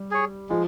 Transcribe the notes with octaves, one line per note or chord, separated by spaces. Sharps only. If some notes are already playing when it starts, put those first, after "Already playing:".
Already playing: G3
G#4 C#5
F3 G#3